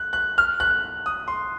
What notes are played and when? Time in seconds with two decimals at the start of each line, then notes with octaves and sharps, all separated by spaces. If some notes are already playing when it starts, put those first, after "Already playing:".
Already playing: F#6
0.13 F#6
0.38 F6
0.60 F#6
1.06 D#6
1.28 C6